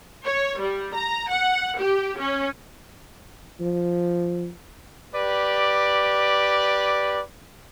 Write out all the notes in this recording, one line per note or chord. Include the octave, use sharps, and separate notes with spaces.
C#5
G3
A#5
F#5
G4
C#4
F3
G4 B4 D5